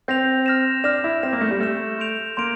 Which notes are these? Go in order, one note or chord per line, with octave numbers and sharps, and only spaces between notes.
C4 G6 A#6 F7
F6 A#6 E7
D4 F6 A#6 E7
E4
C4 F6 A#6 E7
A#3
A3
G3
A3 F6 A#6 E7
C6 G6 D7 F7
A#3 C6 G6 D7 F7